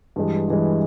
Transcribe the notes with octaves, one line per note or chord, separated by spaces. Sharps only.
G2 E3 G#3
G2 E3 G#3